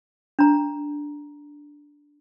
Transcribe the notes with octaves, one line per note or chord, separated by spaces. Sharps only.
D4 A#5